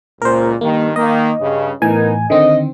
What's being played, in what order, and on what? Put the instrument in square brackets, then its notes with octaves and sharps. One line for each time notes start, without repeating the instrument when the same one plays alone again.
[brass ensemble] C#2 A#2 [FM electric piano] A#4 C5
[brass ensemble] G2 D#3 [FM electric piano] A#3
[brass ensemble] D#3 A#3 [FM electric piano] D#5
[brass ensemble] G2 C#3
[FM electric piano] A2 E3 G#5 [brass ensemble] B3 D#4 A#4
[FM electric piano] D3 D#3 C4 [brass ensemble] D#5